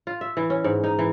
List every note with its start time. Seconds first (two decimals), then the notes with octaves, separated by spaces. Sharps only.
0.07 F4
0.21 E5
0.37 E3
0.50 C#4
0.64 G#2
0.84 D#4
0.99 E3